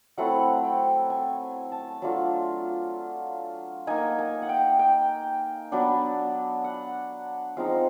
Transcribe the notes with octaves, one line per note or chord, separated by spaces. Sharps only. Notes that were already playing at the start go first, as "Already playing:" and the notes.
F#3 A3 C4 E4 F#5
G5
G#5
A5
F#3 A3 D4 F4
A#3 D#4 G#5
G#5
F#5
G5
G5
F#3 B3 D4
F#5
F3 G#3 C4 D#4 F5